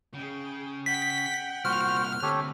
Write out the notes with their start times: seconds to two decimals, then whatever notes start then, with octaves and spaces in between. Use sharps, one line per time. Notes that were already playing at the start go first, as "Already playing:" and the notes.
0.14 C#3 G#4 G5
0.86 F#5 G5 B6
1.65 C2 A#2 F#4 C5 F6
2.22 D2 C3 G4 A4 B4 C#5